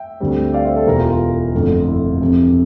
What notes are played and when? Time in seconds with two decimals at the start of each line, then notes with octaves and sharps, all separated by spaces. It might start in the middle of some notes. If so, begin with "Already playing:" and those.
Already playing: E5 G5
0.20 D2 D3 G3 C4
0.53 D5 F5
0.65 C5 E5
0.76 A4 C5
0.87 E1 E2 E3 G4 A#4
0.98 F4 A4
1.10 F4
1.54 G1 F2 D3 A3
1.88 E4
2.21 F2 C3 E3